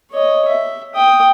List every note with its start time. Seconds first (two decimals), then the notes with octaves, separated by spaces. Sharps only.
0.12 C#5 D#5
0.48 E5
0.95 G5 D#6